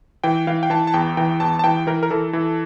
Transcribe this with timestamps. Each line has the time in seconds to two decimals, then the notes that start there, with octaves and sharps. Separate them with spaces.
0.24 E3 G5
0.47 E3 F5
0.63 G5
0.70 E3 A5
0.87 A5
0.94 E2 G5
1.17 E3 G5
1.40 E2 A5
1.59 A5
1.64 E3 G5
1.87 E3 A#4
2.03 A#4
2.11 E3 A4
2.33 E3